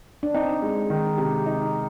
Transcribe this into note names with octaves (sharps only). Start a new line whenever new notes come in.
D4
C4 D#4
G#3
D#3
C3 G4
D#4